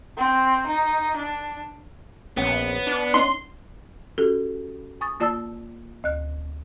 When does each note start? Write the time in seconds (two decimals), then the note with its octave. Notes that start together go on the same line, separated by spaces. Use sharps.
0.17 C4
0.66 D#4
1.16 D4
2.37 A#1 B3 C#4 F#5
2.87 D4
3.14 C#4 D#4 C6
4.18 C#4 F#4 G4 A4
5.01 G#5 C#6 D#6 A6
5.20 A#3 F4 D5 A5 E6 A6
6.04 D2 F#6